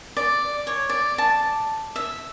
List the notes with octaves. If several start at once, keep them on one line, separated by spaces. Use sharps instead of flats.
D5
C#5
D5
A5
E5